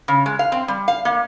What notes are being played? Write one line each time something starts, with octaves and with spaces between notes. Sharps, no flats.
C#3
G#3
F5
C4
G3
F5
A#3